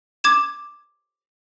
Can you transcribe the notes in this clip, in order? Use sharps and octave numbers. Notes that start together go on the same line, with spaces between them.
D6 G#6 E7